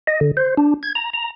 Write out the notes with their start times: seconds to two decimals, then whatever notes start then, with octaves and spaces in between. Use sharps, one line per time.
0.07 D#5
0.21 D3
0.37 C5
0.57 D4
0.83 G#6
0.95 A#5
1.13 A#5